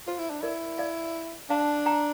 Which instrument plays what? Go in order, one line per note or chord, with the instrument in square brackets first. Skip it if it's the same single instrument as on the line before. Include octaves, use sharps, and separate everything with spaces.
[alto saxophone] F4 [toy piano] C5
[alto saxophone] E4
D4
[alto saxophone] E4 [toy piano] A#4 D5
[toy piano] D5 F5
[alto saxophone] D4 [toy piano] F5 A5
[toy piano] G5 A#5